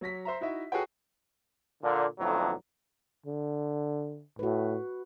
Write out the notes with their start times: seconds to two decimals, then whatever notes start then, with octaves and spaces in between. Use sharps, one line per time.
0.01 F#3 C#5 A#6 B6
0.25 C5 E5 A#5
0.41 D#4 E4 F#4 D#5 E5
0.72 F#4 G#4 A4 B4 C#5 G5
1.83 A#2 D3
2.19 B1 F2 A2 D3 F#3
3.26 D3
4.39 A2 F#4 B4